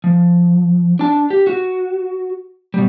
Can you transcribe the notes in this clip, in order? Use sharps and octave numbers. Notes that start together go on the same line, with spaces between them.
F3
D4 A5
G4
F#4
B2 G3